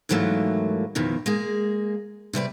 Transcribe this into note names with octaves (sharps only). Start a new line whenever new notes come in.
D#2 G#2 E3 F#3 A3 A#3
F2 B2 D#3 E3
G#3 A#3 G#4
C3 G3 B4 D5